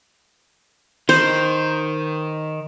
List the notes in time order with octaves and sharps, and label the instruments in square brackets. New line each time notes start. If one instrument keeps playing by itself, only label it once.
[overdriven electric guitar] D#3 [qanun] C5